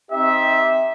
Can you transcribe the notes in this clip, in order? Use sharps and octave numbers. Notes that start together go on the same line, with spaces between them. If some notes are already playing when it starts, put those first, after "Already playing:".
C4 D#4 G4 E5